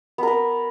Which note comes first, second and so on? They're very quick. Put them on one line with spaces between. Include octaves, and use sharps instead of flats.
B3 A#4 B4